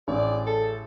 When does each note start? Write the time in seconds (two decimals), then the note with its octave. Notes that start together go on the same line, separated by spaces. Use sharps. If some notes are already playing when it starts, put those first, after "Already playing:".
0.08 A1 G#4 D5
0.46 A4